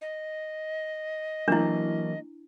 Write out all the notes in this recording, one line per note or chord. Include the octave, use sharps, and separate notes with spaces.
D#5
E3 F#3 A#3 D4 E4